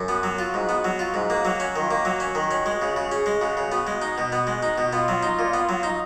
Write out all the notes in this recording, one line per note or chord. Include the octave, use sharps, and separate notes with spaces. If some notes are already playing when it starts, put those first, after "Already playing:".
Already playing: F#2
B3 F#4
F#3
F4
G#2
B3
F#3
F4
G#2
A#3
F#3
C#4
D#3
F4
A#3 F#4
F#3
C#4
D#3
C#4
G#3
C#3
C#3
C#4 G#4
G#3
C#3 F#4
C#3
B3 F#4
G#3
D#4
B2
B3
G#3
D#4
B2
F#4
B3 F4
F#3
D#4
A#2
B3
F#3
D#4